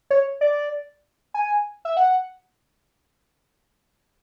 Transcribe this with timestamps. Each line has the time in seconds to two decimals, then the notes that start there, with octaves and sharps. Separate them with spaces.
0.10 C#5
0.41 D5
1.34 G#5
1.85 E5
1.97 F#5